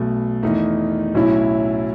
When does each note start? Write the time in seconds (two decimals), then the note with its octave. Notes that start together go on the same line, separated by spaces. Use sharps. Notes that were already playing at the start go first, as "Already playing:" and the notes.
Already playing: B1 B2 A3
0.43 E2 D#3 A3 D#4
1.14 B1 A2 F#3 C#4 E4